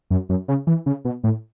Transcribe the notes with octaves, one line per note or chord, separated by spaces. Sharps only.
F#2
F#2
C#3
E3
C#3
B2
A2